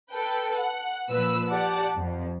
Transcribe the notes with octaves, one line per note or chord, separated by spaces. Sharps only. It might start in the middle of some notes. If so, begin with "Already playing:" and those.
A4 B4 G5
F#5
A#2 F3 B4 E6
G4 D5 F#5 A5
F2